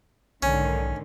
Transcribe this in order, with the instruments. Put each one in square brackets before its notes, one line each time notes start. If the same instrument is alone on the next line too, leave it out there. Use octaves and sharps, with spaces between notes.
[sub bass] B1 [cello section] G#2 D3 D#3 [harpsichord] C#4